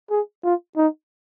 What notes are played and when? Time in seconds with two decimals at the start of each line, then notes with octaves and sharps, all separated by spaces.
0.11 G#4
0.44 F4
0.77 D#4